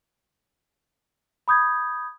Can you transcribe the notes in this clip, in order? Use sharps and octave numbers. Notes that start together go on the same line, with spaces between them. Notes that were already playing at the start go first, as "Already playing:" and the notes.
B5 D#6 G6 G#6